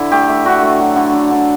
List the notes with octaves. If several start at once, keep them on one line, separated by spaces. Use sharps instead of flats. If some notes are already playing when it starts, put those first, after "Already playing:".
Already playing: D3 E4
A3 G4
A3
D3 F#4
A3
F#3
D3
D3
D3